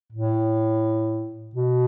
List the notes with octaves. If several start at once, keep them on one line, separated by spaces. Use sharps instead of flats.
A2
B2